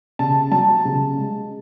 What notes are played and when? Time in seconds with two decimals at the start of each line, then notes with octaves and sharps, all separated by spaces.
0.19 C#3 A5
0.51 F#3 A5
0.85 C#3
1.18 G#3